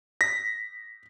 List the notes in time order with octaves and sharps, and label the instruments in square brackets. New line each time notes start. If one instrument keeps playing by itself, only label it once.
[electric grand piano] A#6 B6